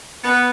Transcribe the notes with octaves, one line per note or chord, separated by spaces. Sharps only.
B3